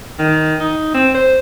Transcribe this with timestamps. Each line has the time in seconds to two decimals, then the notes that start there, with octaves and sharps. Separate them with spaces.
0.19 D#3
0.60 D#4
0.94 C4
1.14 C5